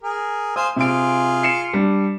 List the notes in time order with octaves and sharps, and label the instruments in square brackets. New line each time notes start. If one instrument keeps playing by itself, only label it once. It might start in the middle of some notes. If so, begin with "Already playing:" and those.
[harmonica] G#4 A#4
[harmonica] C5 F5 G#5 [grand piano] D#6
[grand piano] C3 D7 [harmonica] F4 G#4
[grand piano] C7 C#7 E7
G3 D4